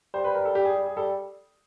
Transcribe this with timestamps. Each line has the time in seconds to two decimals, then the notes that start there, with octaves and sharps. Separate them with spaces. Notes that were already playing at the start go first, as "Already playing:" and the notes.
0.14 G3 C5
0.24 B4
0.35 A#4
0.45 A4
0.55 G4
0.65 G#4
0.76 G4
0.86 G#4
0.96 G3 A4